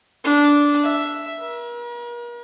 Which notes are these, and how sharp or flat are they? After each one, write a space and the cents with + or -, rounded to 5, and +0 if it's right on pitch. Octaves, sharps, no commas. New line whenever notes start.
D4 -10
E5 +5
A#4 +40